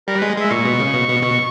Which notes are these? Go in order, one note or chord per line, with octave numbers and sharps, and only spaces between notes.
G3 A#4
G#3 B4
G#3 E5
A#2 C#6
B2
C#3
B2
B2
B2